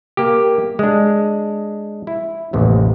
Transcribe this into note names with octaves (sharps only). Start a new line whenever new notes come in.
A#3 G4
G#3 D4
E4
A1 D#2 C3